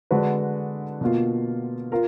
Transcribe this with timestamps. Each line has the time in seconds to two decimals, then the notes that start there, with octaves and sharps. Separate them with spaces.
0.11 D3 G#3 D4 F#4 B4
1.01 B2 A#3 F4
1.92 F4 A#4